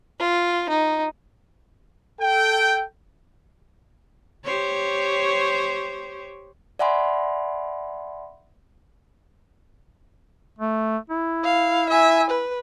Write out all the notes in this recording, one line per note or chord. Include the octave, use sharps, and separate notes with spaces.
F4
D#4
A4 G5
G4 C5 C#5
D5 E5 F#5 G#5 B5 C6
A3
E4
F5
E5 G#5
B4